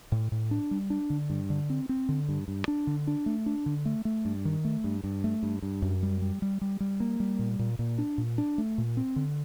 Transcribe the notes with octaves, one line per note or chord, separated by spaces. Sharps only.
A2
A2
D4
G3
D4
D3
G2
D3
C4
C4
D3
G2
G2
D4
D3
D4
A3
D4
D3
A3
A3
G2
D#3
A3
G2
G2
A3
G2
G2
F#2
G3
G3
G3
G3
G3
A#3
G3
A#2
A#2
A#2
D4
A#2
D4
A3
A#2
C4
D3